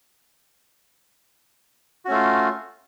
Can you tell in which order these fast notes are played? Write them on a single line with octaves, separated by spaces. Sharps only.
F#4 C#4 A3 F4